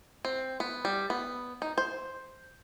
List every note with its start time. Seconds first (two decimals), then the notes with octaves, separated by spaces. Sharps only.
0.25 C4
0.60 B3
0.85 G3
1.10 B3
1.62 D#4
1.78 C5